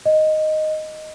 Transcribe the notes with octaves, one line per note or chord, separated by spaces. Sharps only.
D#5